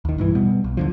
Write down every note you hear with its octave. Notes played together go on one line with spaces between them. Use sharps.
D#2 D#3
B1 G2 E3
B2 G3 B3
B1
D#2 D3 F3